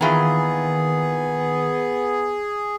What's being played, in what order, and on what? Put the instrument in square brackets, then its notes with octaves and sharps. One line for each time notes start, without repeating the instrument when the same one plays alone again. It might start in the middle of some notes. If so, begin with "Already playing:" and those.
[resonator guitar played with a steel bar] A#2 E3 F4 [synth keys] D#3 [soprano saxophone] B3 [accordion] G#4